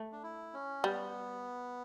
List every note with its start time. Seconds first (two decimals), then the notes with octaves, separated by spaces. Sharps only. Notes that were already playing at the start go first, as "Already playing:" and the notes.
Already playing: A3
0.12 D4
0.23 E4
0.54 C#4
0.84 G3 B3